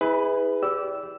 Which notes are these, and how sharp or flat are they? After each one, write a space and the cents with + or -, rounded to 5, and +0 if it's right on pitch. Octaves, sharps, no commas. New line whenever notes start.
E4 -30 G#4 -15 B4 +15
G4 -15 D5 -30 E6 +0